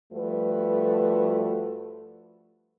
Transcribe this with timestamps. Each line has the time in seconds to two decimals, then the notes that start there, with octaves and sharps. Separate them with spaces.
0.12 G2 F3 A3 F#4 B4